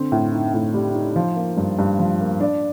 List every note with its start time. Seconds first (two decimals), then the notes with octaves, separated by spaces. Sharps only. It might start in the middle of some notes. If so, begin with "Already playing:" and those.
Already playing: D3 C4
0.12 A2
0.32 D#4
0.54 A2
0.74 G3
0.95 D#4
1.16 F3
1.36 A#3
1.57 G2
1.79 G2
1.99 F3
2.21 A#3
2.40 D4